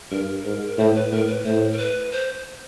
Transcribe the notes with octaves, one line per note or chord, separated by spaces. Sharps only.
G2 A#4
G#2
A2 C5
B4
A2 A#4
B4
A2 C5
A#4
B4
C5